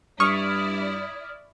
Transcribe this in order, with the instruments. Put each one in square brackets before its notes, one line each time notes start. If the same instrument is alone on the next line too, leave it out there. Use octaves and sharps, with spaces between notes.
[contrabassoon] G2 [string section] E4 D5 [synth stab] C#6 [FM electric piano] D#6 F6 G#6